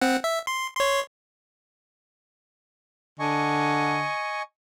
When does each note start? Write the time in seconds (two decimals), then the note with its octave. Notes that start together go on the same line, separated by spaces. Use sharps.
0.01 C4 F#5
0.24 E5
0.47 C6
0.76 C#5 C6
3.20 D3 D#5 G#5 C#6